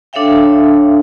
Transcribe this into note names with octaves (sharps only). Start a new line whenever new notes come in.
D4 A4 C#5 E5 F5 G5